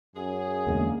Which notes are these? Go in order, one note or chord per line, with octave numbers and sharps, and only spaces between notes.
F#2 G#4
E2 D3 G#3 A#3